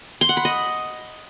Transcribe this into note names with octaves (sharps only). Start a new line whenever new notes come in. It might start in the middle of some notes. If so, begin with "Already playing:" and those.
C6
F#5
B5
D#5